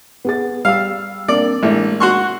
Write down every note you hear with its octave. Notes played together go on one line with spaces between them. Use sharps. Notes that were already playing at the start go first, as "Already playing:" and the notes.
B3 G#4 A6
G3 F5 E6
A#3 C4 D4 D5
A1 G#3 A#3 D4
F#4 C6 C#6